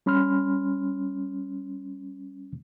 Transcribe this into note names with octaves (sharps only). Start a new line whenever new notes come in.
G3 C#4 B5 C6 F6